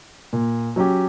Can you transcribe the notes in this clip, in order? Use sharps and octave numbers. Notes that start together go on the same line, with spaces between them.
A#2
F#3 C#4 G4